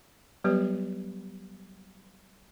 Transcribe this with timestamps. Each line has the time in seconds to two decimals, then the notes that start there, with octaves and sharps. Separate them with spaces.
0.44 F#3 G3 B3 G4 B4 D5